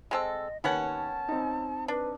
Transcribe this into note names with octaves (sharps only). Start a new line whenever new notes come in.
G#3 C4 A4 D#5
D#2 B3 C#4 F#5 A5
C4 D#4
D4 B4